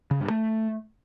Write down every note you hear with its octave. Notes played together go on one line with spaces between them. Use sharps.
C#3
G2
A3